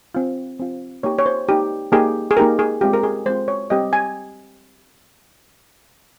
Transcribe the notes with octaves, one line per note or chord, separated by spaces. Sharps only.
C4 F4
C4 F4
A#3 D#4 G4 C#5
C#5
C5
A#3 D#4 G4
A#3 D#4 G4 G#4
G#4
A#3 D#4 G4 A#4
G#4
G#3 C4 F4 G4
A#4
G#4
G#3 C4 F4 C5
C#5
G3 C4 G4 D#5
G#5